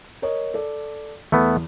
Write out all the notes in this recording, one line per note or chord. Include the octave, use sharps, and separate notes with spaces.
A#4 C#5 D#5
A4 D5
E2 A3 B3